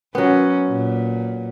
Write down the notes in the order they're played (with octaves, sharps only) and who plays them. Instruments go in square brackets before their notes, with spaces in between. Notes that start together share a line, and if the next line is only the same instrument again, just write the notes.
[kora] F#3 B3 [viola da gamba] C#4
[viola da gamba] A#2